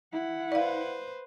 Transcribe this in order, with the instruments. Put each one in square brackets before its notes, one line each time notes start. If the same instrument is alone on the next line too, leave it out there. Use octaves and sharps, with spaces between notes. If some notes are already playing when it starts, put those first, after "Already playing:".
[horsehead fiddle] E4 F#5
[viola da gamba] B4 C5 [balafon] D5 F5